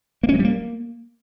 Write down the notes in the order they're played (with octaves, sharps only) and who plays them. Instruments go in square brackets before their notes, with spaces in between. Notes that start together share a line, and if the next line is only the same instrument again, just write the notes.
[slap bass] A#3
C#4
F#3
G3
A#3